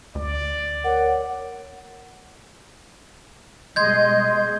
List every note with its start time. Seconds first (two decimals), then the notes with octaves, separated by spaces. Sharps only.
0.15 D2 D5
0.84 A#4 C#5 F#5
3.76 B2 G3 G#3 D#5 C6 G6 G#6